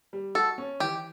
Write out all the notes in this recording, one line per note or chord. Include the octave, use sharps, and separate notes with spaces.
G3
F#4 A4
C#4
E3 G4